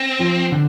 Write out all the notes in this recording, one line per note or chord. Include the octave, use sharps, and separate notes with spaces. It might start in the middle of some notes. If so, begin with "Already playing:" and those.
Already playing: C4
F3
D3